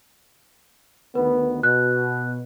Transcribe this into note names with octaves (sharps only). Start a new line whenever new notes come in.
D2 D#3 B3 B4
B2 F#6